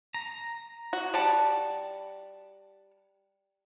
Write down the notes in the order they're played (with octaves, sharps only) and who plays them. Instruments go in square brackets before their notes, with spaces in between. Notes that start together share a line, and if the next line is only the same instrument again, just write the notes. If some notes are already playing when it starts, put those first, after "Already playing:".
[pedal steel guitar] A#5
[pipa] F#4
G3 F#5 A5